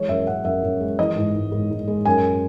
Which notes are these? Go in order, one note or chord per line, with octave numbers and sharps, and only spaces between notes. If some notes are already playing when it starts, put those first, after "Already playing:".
Already playing: E3 G#3 C#5
F#2 E5
F#2 F#5
F#2 E5
F#2
G#3
E3 D#5
G#2
G#2
G#2
G#2
G#3
F#2 G#5